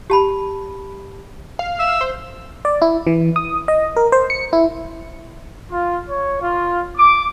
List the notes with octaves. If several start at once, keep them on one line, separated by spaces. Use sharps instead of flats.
G4 A5 B5
F5
E5
C5
D5
E4
E3
D#6
D#5
A#4
C5
C#7
E4
F4
C#5
F4
D6